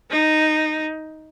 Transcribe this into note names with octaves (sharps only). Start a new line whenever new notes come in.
D#4